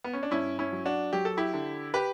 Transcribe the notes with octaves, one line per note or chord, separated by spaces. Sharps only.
B3
C#4
D4
G2 C#4 E4
C#4 E4
F#3
D4 F#4
F#3 G4
A4
E4 G4
D3
G4 B4